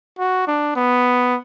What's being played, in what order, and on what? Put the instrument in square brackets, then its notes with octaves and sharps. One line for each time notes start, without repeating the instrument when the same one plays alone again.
[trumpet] F#4
D4
B3